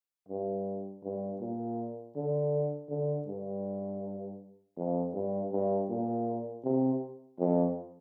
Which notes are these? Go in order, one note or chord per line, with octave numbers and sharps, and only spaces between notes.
G2
G2
A#2
D3
D3
G2
F2
G2
G2
A#2
C3
F2